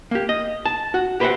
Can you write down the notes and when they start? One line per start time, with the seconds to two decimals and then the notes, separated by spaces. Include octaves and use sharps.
0.11 A#3 G4
0.29 D#5
0.65 A5
0.94 F#4
1.20 G4 B4 C5 D5 E5 F#5